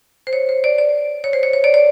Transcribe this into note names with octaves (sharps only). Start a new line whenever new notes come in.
C5
C#5
C5
D5
D5
C#5
C5
C#5
C#5
D5
D5